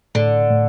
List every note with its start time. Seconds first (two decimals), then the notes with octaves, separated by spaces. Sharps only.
0.15 A2 D3
0.51 A2